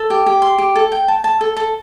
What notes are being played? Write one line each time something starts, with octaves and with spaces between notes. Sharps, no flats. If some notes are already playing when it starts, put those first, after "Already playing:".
Already playing: A4
G4
G4
C6
G4
A4
G5
A5
A5
A4
A4